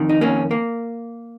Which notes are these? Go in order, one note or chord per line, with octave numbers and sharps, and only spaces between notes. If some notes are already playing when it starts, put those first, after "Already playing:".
Already playing: F2 D#3
D#4
A#3 C#4
A#3